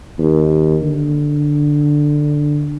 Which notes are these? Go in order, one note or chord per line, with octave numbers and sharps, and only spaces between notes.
D#2
D3